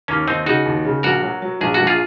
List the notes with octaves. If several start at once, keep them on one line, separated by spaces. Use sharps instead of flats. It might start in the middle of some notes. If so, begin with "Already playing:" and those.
D#2 A#3 C#4
D#2 C4 D#4
C#3 D#4 F#4
D#2
C#3
A#1 F#4 A#4
F#3
F#3
A#1 G#4
A#1 F#4
F4 G#4